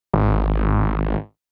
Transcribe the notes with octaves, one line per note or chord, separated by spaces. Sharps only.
G#1